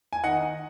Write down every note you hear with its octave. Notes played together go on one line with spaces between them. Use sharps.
G#5
D#3 D#5 F#5